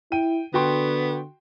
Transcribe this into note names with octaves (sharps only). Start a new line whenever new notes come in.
E4 G5 D#7
D3 B3 F#4 G5 C6